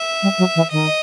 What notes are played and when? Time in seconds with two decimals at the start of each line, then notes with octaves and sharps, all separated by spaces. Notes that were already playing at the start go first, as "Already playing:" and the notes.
Already playing: E5
0.23 G3
0.38 F#3
0.55 E3
0.72 D#3 D#5